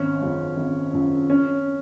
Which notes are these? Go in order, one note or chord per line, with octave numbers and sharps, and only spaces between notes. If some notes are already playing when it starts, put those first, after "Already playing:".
Already playing: G#1 C#4
F#2 C#3 F3
G#1
F#2 C#3 F3
C#4